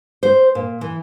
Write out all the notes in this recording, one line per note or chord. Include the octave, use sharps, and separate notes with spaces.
C5
A#2
E3